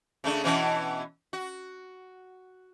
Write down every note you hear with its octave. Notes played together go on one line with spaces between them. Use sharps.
C#3 A3 D4
B2 E3 C#4
F#4